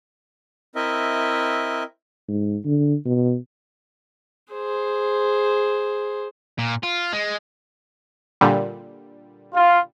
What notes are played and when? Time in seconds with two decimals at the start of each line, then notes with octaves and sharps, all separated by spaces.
0.75 C4 E4 A#4 D#5 E5
2.29 G#2
2.66 D3
3.06 B2
4.52 G#4 C5
6.59 A#2
6.83 F4
7.13 G#3
8.41 A#2 D3 G3
9.55 F4